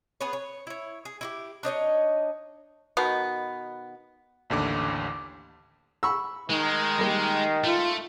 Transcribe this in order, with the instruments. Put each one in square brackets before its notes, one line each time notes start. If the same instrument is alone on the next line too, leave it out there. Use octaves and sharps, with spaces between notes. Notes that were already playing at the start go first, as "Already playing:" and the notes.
[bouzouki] B3 G#4 B4 C#5
C#5
E4 C#5
G#4
E4 F#4 G4
D4 D#4 C#5 D#5
[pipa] B2 D#3 B3
[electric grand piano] A1 D#2 D3 D6
[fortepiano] B5 C#6 E6
[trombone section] D#3 [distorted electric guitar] G#3
[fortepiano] G3 A#3
[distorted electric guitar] A3 [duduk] F4